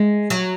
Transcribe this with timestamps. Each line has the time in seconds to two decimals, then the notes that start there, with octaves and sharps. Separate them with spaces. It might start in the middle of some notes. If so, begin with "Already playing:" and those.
Already playing: G#3
0.30 F#3